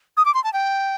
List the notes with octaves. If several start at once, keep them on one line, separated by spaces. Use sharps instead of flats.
D#6
D6
C6
A5
G5